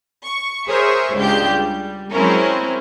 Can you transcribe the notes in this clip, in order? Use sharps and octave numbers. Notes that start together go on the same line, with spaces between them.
C#6
G#4 A#4 C5 C#5 E5
C#2 G#3 D4 G4 G6
G3
F#3 G#3 C4 C#4 E4 A#4